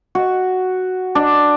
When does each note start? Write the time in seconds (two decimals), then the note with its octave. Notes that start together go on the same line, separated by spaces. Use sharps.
0.15 F#4
1.15 D4